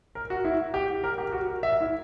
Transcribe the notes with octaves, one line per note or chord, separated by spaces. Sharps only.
A#4
F#4
E4
G4
A#4
G4
F#4
A#4
E5
E4